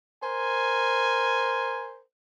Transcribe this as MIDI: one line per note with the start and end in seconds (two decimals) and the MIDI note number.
0.23 2.01 70
0.23 2.01 72
0.23 2.01 80